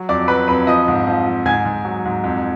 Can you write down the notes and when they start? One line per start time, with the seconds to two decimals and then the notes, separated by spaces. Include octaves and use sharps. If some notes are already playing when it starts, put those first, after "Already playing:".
Already playing: F#3
0.09 F2 D5 D6
0.28 F#3 B4 B5
0.48 F2 B4 B5
0.67 F3 D#5 D#6
0.88 G#2
1.07 F3
1.27 F3
1.45 G#2 G#5 G#6
1.65 G#2
1.85 F#3
2.05 G#2
2.24 F2